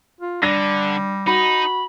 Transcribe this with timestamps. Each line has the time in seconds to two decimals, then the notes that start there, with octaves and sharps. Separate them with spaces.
0.21 F4
0.42 D3 G3 D4 A#6
1.27 D#4 F#4 B5